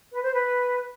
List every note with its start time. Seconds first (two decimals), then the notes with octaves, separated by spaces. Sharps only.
0.12 B4
0.23 C5
0.33 B4